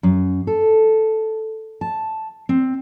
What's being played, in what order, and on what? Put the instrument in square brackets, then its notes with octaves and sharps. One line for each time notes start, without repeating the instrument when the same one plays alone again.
[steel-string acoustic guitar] F#2
A4
A5
C4